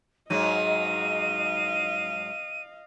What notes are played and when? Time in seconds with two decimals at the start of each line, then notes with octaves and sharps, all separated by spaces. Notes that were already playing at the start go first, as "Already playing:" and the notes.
0.30 G#2 F#3 D#5 F5 D#7